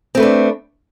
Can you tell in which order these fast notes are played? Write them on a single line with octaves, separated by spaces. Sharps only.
C4 A3 B4 D4